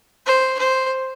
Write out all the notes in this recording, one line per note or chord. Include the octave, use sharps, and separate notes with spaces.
C5
C5